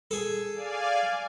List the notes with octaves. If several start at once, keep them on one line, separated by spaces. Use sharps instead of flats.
G#4 A4
D5 F5 G#5